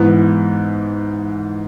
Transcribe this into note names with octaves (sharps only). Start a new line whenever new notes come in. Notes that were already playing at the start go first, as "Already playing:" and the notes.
Already playing: G#2 E3 B3